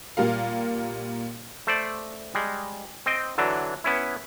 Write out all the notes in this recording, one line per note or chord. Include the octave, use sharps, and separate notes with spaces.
A#2 G3 A#4 F5
A3 C5 D5
G3 G#3
C4 D#5 G5
D3 E3 F#3 D4
B3 C#4 E4